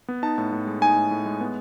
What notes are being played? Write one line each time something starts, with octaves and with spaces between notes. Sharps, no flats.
B3
D#4 A5
A2
A2
G#3
D#4 G#5
A2
A2
G#3
B3